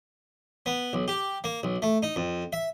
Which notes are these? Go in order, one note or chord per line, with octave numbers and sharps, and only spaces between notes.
B3
B1
G4
A#3
B1
A3
D#4
F2
E5